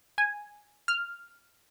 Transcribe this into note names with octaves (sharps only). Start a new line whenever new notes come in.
G#5
F6